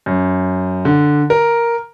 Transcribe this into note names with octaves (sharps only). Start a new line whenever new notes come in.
F#2
D3
A#4